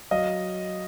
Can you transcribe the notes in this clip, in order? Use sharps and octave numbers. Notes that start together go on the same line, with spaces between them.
F#3 D#5 F5